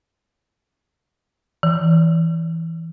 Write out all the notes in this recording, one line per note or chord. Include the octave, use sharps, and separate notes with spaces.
E3